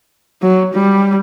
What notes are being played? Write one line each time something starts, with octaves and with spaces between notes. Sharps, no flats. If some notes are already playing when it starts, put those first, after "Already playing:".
F#3
G3